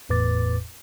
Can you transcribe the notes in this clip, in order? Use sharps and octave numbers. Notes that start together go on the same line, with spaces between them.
G1 E2 A2 B4 D6 A6